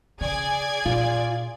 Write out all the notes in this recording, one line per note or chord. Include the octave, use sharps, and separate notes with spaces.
C#3 G#4 D5 G#6
A#2 F4